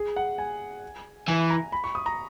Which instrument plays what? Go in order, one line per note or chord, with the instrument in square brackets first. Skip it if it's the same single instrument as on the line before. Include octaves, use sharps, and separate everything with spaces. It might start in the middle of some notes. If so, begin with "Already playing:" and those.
Already playing: [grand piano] G#4
F#5
G#5
[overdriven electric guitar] E3 [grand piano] G#5
[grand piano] A#5
B5
C#6
D#6
A#5